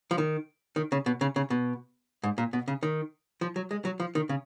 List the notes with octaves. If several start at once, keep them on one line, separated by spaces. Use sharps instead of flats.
F3
D#3
D#3
C#3
B2
C#3
C#3
B2
G#2
A#2
B2
C#3
D#3
F3
F#3
G#3
F#3
F3
D#3
C#3